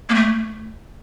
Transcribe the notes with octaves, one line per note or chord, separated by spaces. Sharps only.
A#3
A3